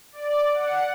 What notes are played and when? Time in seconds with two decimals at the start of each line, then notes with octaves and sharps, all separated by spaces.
0.12 D5
0.54 F#5